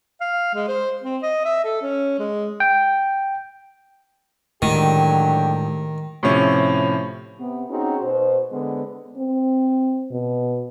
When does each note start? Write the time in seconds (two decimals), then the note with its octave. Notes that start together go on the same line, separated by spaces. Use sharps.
0.21 F5
0.54 G#3
0.68 C5
1.03 C4
1.23 D#5
1.45 E5
1.64 A4
1.82 C#4
2.19 G#3
2.60 G5
4.62 A2 D3 D#3 F#3 G#3 G4
6.23 A2 C3 F3 C#4
7.40 C3 B3
7.70 C4 C#4 D#4 F#4 G#4
8.03 B2 C5
8.51 D3 G#3 B3
9.17 C4
10.11 B2